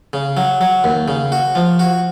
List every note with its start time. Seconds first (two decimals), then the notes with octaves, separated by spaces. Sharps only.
0.13 C#3
0.37 F#3
0.61 F#3
0.84 D#2
1.08 C#3
1.32 F#4
1.55 F3
1.79 F#4